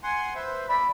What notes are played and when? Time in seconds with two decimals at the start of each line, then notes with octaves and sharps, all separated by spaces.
0.03 F#5 G#5 C6
0.35 B4 C5 E5
0.69 A#2 D5 E5 B5